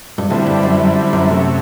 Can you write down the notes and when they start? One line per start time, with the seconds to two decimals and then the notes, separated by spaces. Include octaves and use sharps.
0.18 G2
0.30 A2 D3 G3 C4 E4
0.47 G2
0.63 F#2
0.80 F#2
1.13 F#2
1.30 C3 F#3 A3